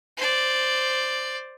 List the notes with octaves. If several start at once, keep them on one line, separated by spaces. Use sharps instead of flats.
C5 D5